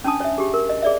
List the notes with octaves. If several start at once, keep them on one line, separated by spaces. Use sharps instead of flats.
C#4 D4 G#5 A5 D#6
C#5 E5
G4 G#4
A#4
D#5
G#4 D5 E5